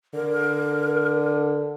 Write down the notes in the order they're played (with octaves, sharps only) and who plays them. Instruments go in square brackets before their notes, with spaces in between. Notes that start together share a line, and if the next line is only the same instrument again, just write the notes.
[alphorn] D3 [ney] A#4